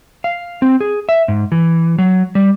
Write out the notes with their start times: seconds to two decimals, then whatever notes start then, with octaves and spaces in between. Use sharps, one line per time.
0.24 F5
0.62 C4
0.80 G#4
1.09 E5
1.28 G#2
1.52 E3
1.98 F#3
2.35 G3